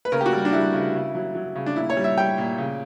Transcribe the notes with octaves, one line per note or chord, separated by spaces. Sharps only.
B4
C#3 A#4
G4
F#4
G3
D4
G3 E4
C#3
C#3
F#3
F#3
C#3
D4
A#2 E4
C#5
G3
E5
G3 G5
A#2
C#3